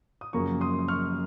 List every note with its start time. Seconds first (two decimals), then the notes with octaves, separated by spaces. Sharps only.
0.21 D#6
0.33 F#2 C#3 F3 A#3 A#5 C#6
0.61 C6 D#6
0.79 D#6
0.88 C#6 F6